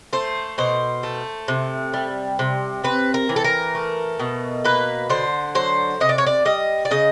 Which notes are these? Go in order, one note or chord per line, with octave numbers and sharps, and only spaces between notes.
A3 C5
B2 C5
A3
C3
G3
C3
C4 B4
A#4
E3
A4
A#4
A3
B2
A#3 B4
D3 C5
F#3 C5
C3 D#5
D5
C#5
D5
G3 D#5
D5
C#3 D#5